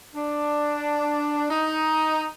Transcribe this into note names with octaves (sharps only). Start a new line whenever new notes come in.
D4
D#4